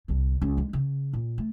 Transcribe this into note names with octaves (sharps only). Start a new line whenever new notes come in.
C2 D3
C#2
D2 G#3
C#3
A#2
A3